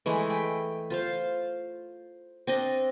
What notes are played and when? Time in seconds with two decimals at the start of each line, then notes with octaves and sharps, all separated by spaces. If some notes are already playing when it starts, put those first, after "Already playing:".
0.06 E3 G#3 A3 E4
0.30 G5
0.90 F4 C5 F5
2.47 C4 D4 D#5